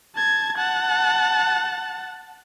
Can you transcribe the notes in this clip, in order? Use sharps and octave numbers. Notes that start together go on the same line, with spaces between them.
A5 G#6
F#5 A5